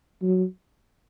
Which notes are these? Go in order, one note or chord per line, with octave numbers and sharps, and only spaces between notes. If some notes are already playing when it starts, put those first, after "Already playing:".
F#3